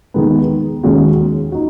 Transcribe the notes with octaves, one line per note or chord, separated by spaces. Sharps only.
D#2 D#3 G#3 B3
D#2 D#3 G#3 C#4 F#4
D#4 F#4